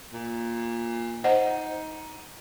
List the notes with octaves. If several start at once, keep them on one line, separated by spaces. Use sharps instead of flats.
A#2
D#4 C5 D#5 F#5